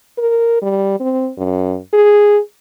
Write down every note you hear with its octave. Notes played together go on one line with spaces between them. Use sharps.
A#4
G3
C4
F#2
G#4